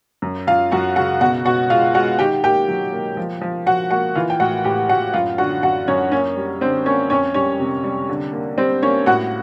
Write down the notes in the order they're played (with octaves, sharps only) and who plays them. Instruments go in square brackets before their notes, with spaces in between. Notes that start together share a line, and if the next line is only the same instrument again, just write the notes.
[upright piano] F#2
F#2 F4 F5
F#2 F#4 F#5
C#3 F#4 F#5
B2 F#4 F#5
B2 F#4 F#5
G#3 F4 F5
G#3 F#4 F#5
D#3 G4 G5
A#3 G4 G5
F#3
A#3
F3
F3
F3 F#4 F#5
A#3 F#4 F#5
E3 F4 F5
G5
A2 F#4 F#5
A2 G4 G5
A2 F#4 F#5
F#2 F4 F5
D3 F#4 F#5
F#2 F#4 F#5
F#2 C#4 C#5
A#3 C#4 C#5
G3
D3 C4 C5
A#3 C#4 C#5
F2 C#4 C#5
G3 C#4 C#5
C3
G3
D3
A#3
G3 C4 C5
A#3 C#4 C#5
A2 F#4 F#5